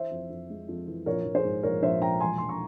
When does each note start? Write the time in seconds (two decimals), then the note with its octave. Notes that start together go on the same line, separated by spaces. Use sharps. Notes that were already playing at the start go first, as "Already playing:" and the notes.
Already playing: E3 C5 E5
0.11 F2
0.30 F2
0.50 G#3
0.68 F2
0.88 E3
1.06 A#1 A#4 C#5
1.25 A#1
1.35 G#4 C5
1.45 G#2
1.63 A#1 A#4 C#5
1.82 A#1 C5 E5
2.01 A#1 G5 A#5
2.20 E1 G#5 C6
2.38 E1 C6
2.49 A#5 C#6